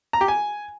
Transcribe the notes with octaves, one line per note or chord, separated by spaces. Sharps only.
A#5
G4
G#5